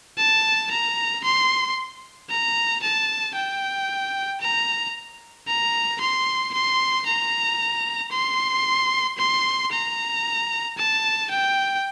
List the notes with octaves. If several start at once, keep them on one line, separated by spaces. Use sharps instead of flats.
A5
A#5
C6
A#5
A5
G5
A#5
A#5
C6
C6
A#5
C6
C6
A#5
A5
G5